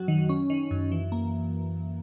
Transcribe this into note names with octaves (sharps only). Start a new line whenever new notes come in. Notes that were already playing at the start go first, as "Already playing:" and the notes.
Already playing: F#2 F#3 F#4
D#3
C#4
D#3
F#2
E3
A#3